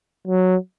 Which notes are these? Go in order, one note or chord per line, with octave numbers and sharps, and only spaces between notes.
F#3